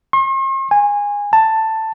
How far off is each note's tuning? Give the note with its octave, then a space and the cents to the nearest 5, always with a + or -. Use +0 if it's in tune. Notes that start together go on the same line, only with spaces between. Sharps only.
C6 +45
G#5 -20
A5 +10